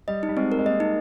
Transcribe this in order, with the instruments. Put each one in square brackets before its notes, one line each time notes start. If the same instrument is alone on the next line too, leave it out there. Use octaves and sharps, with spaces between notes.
[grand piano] G3 [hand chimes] D#5
[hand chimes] D#4
[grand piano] G3
[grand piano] G#3 [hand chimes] C4
[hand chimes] A#4
[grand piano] G#3
[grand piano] A#3 [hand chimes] D#5
[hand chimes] D#4